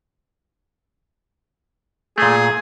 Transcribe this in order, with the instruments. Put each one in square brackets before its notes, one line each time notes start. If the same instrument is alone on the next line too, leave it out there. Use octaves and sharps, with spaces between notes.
[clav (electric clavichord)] A#2 A3 [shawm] G#4